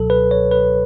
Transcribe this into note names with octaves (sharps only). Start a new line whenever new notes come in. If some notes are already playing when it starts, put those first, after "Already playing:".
Already playing: C#2 B2 F#3 A4
B4
C#5
B4